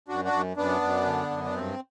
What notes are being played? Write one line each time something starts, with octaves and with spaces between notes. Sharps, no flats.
F#2 D4 F#4
D4 F#4
F#2
F#2 B3 D4
F#2
D3
F#2
D4
G2 C4